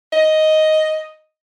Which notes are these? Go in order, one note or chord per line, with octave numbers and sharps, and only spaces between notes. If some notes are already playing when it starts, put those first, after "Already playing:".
D#5